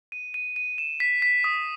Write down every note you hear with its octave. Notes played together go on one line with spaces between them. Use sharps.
D#7
D#7
D#7
E7
B6
B6
D#6